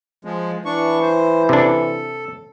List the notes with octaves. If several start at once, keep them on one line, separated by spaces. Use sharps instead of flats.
F3 G#3
E3 D4 C#6
C5
C3 D4 A4